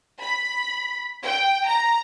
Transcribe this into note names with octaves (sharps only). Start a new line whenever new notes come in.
B5
G5
A#5